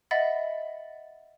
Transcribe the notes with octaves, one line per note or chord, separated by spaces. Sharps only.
D#5 E5 F#5 B5 A6